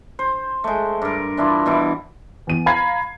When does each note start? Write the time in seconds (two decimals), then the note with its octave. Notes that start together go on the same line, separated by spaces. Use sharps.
0.19 C5
0.64 G#3 A3
1.02 G2 A#4
1.37 E3 D4 E4 F4
1.66 B2 E3 E4
2.47 E2 D#7
2.66 F5 A#5 B5 G#6 C7